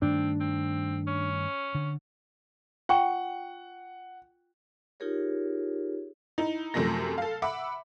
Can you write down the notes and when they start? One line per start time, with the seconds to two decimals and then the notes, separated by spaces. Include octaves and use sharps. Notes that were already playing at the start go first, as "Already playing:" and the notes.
0.02 G2 D#3 A3 C4 D4
0.40 C4
1.07 C#4
1.75 D3
2.89 F4 F#5 G5 C#6
5.00 D#4 F4 G4 G#4 A#4 C#5
6.38 D#4 E4
6.74 F#2 C3 F3 A3 A#6
7.18 A4 F5
7.42 E5 F#5 B5 D6